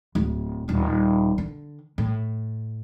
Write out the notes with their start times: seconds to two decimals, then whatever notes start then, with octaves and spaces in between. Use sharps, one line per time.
0.15 D1
0.68 D#1 D4
1.38 D3
1.98 A2